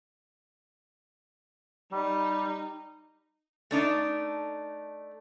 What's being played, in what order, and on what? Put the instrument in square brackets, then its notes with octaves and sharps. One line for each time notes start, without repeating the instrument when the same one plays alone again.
[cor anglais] G3 [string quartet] D#4
[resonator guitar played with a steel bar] A3 D4 D#4